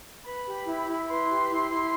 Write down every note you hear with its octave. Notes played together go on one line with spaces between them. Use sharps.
B4 B5
G4
E4
E4
B4 C6
G4
E4
E4